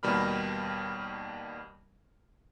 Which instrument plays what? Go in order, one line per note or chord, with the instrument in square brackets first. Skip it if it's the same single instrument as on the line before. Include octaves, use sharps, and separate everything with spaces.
[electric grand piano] D#2 B2 G3 A#4 B5 F6